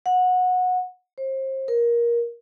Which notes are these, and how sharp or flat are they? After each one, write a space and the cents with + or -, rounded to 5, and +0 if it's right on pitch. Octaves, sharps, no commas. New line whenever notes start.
F#5 -20
C5 +30
A#4 +15